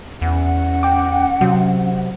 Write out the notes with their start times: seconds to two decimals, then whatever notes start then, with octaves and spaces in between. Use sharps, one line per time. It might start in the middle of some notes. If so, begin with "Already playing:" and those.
0.22 E2 C#4 F#5
0.83 G5 D6
1.41 C3 F#3